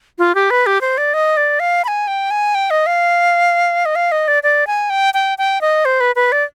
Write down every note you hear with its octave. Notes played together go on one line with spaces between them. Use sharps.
F4
G4
B4
G4
C5
D5
D#5
D5
F5
B5
G#5
G5
G#5
G5
D#5
F5
D#5
F5
D#5
D5
D5
G#5
G5
G5
G5
D#5
C5
B4
B4
D5